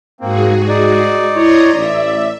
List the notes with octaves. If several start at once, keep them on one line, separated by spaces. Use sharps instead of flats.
G#2 A#3 C4 F#4 G#4
D#4 D5
E4 C#5 A#5 C6 D#6
A1 D5 E5